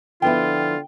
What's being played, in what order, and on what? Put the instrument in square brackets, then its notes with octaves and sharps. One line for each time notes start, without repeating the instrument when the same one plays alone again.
[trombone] D3 [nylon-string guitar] F3 B3 E4 [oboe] F4 [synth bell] G5